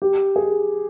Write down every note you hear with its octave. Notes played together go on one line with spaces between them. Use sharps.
G4
G#4